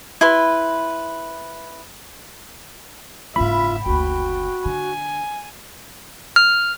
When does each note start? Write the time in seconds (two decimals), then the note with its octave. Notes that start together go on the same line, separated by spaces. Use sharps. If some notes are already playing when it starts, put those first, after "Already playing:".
0.21 E4 B4 C6
3.36 F#1 G#2 F4 E5 B5
3.86 F#1 D2 F#4 G5
4.66 D3 G#5
6.36 F6